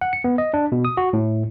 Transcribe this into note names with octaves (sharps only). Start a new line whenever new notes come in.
F#5
C#7
B3
D#5
D4
B2
D#6
F#4
A2